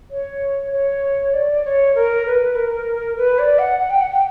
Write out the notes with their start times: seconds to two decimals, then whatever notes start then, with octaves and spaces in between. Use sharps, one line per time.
0.11 C#5
0.72 C#5
1.34 D5
1.65 C#5
1.95 A#4
2.26 B4
2.56 A#4
3.17 B4
3.39 D5
3.59 F#5
3.79 F#5
3.90 G5
4.01 F#5
4.11 G5